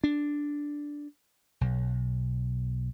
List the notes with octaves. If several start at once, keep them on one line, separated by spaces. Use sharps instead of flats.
D4
B1